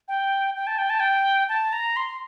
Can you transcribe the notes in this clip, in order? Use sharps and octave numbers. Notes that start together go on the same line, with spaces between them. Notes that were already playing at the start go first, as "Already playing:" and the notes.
G5
G5
A5
G5
A5
G5
A5
A#5
C6